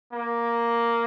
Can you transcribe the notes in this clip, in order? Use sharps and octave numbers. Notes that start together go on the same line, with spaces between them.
A#3